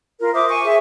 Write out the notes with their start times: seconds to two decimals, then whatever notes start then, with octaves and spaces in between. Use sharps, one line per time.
0.20 F4 A#4
0.34 C5 E5 D6 D#6
0.49 G#5 C#6
0.65 G#4 E5